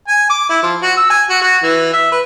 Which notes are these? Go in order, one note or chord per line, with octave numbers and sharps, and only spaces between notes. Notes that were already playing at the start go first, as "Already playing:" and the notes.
G#5
D6
E4
F3
F#4
E6
G#5
F#4
F#4
E3
E5
B4